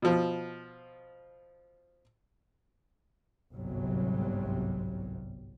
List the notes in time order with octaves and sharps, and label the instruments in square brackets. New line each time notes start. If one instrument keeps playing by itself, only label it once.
[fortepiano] B2 F3
[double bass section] G1 C2 G#2 C3 F#3 G3